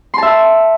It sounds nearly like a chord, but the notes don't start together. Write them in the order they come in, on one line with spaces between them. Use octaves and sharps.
C6 A5 E5 E6